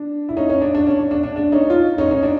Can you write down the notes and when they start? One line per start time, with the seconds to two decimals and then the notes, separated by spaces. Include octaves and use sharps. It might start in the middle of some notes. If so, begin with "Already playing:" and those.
Already playing: D4
0.29 E4
0.36 C#4 D#4
0.49 C#4
0.62 D4
0.75 D4
0.87 C#4
0.99 D4
1.11 D4
1.23 D4
1.36 D4
1.52 C#4 D#4
1.70 D#4 F4
1.98 C#4 D#4
2.11 C#4 D#4
2.23 D4